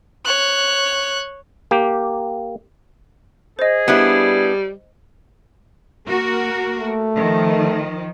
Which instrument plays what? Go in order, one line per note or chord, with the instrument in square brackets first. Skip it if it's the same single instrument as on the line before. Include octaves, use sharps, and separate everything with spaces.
[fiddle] C#5 F#6
[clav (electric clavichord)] A#3 G4
[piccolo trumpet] G#4 [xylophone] C5 D#5
[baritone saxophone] G3 [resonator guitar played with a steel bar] B3 D4 E4
[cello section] A#3 F#4 A#4
[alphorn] A3
[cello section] D#3 F3